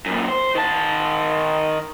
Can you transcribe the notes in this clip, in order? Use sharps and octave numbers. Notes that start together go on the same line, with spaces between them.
F#2 A#2
C5
D#3 A5